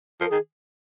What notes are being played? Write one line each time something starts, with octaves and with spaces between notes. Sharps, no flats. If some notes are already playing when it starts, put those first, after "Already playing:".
F3 A#4
D#3 G#4